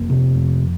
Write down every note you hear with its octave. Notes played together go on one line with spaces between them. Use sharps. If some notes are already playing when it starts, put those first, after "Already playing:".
Already playing: F1 A#3
C3
F2